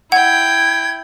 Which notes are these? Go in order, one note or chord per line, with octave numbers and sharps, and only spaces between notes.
E4 F#5 G5 G#6